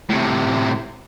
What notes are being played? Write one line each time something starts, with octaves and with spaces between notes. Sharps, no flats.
A2 C3